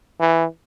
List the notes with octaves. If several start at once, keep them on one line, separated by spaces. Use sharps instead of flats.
E3